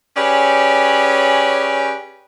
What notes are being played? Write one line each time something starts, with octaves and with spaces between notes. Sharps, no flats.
C#4 G4 G#4 B4 C#5 D5